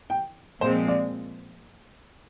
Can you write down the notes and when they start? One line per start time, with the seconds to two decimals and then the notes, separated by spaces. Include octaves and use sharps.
0.10 G5
0.61 A#2 F3 G#3 C4 C5
0.88 D5